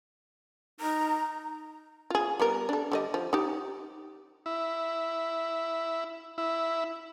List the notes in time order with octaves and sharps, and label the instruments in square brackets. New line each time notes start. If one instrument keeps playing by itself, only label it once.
[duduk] D#4 [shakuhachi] A#5
[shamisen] F4 G#4
G3 B3 A#4
D4 A4
D3 G3 D#5
F3
D#4 G4
[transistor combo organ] E4
E4